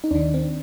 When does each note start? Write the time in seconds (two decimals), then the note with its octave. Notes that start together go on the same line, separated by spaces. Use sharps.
0.04 D#4
0.11 D#2 D#3 D4
0.34 C4